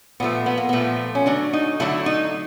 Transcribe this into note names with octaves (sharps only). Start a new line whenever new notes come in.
A#2 F3 A3 B3
B3
A#3
A#2 F3 A3 B3
C#4
D3 F#3 A3 D4
D#4
D3 F#3 A3 E4
D#4